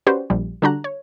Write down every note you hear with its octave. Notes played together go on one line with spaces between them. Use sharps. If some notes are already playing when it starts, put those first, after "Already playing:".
C#4 F#4 G4 B4 C5 D5
A#1 G3
D3 G3 D4 F#4 A#5 F#6
C#5